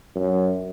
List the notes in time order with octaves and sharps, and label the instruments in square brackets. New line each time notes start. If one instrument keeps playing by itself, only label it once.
[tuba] F#2